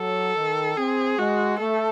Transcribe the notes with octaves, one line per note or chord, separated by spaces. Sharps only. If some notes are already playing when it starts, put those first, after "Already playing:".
Already playing: F#3 A4
D#3
C4 G#4
G#3 F#4
A3 A4